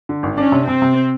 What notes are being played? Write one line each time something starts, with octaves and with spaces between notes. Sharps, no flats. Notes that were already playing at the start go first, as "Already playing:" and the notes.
D3
G#1
C#4 D4
C3
C3 C4
C3